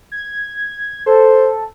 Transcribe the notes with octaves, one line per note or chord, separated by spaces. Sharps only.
G#6
A4 C5